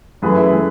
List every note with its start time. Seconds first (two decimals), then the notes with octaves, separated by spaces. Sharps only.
0.22 F#2 E3 A3 G#4 B4
0.37 E4 G#4
0.52 E3 A3